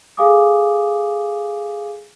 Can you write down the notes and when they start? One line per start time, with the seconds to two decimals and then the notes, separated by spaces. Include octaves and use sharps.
0.17 G#4 A4 F5 G#5 D6 D#6